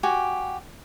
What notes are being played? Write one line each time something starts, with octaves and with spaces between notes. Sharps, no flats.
F#4 G4 G#5